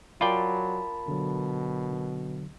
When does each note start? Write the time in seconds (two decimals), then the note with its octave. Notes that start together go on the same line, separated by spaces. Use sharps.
0.21 F#3 F4 A#4 D5 G5 A5 B5
1.08 B2 D3 F#3